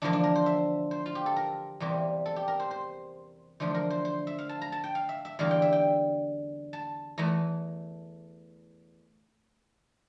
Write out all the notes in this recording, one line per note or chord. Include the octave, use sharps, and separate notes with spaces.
E2 D3 F3 A#3 D4
D4
A#4
C5
E5
C5
F4
G4
A4
A#4
E2 C3 G3 A#3
A4
G4
A#4
C5
C5
E2 D3 F3 A3 C5
A#4
C5
C5
E5
F5
A5
A#5
A5
G5
F5
E5
E5
E2 D3 G3 A#3 F5
G5
E5
G5
A5
E2 E3 A3 A#5